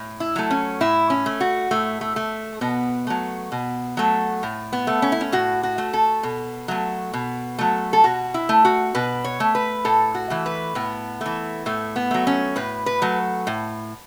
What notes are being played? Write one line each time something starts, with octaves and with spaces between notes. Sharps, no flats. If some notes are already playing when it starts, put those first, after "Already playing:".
Already playing: A2
E4
F#3 A3
C#4
A2 E4
C#4
A3
F#4
A2 A3
A3
A3
B2 B3
F#3 A3
B2
F#3 A3
A2
B3
A3
C#4
E4
C#4
A2 F#4
F#4
A3
A4
B2
F#3 A3
B2
F#3 A3
A4
B2 F#4
E4
A3
F#4
B2 B4
C#5
A3
B4
A2 A4
F#4
E3 A3
B4
A2 B3
E3 A3
A2 A3
B3
F#3 A3
C#4
A2 B4
B4
F#3 A3
A2